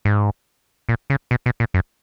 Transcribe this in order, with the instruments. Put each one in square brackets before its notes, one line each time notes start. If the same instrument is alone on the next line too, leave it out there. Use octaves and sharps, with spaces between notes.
[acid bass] G#2
A#2
C#3
B2
B2
A#2
F#2